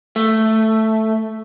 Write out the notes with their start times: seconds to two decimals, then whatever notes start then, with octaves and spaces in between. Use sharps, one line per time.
0.16 A3